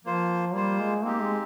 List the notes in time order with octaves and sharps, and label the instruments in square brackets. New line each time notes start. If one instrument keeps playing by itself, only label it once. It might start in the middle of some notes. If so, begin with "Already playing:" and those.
[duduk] F3 [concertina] A#3 F4 C5
[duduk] G3 [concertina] A#3 F4 C5
[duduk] G#3
[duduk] A#3 [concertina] C4 D#4 G4
[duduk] G#3